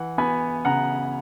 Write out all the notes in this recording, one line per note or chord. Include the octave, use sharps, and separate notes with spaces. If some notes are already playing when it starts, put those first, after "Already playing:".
Already playing: E3 F#5
B3 G#5 B5
C#3 F#5 A#5